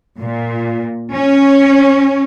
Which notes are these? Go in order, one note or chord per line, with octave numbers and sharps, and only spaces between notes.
A#2
C#4